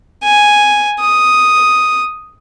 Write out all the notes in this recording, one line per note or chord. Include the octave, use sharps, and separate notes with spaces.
G#5
D#6